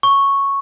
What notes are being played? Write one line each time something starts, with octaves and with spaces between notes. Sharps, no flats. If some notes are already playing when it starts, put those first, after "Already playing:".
C#6